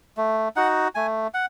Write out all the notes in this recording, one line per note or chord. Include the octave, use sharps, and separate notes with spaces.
A3
D#4 F#4 F#5
A3 G#5
F#5